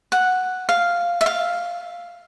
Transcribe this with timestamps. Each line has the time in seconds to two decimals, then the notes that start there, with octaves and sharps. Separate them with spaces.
0.12 F#5
0.69 F5
1.21 E5
1.26 F5